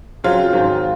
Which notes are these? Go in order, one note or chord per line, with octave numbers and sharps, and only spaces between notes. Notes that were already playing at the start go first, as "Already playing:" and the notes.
C#3 F#3 C4 F4
G#2 D#3 F#3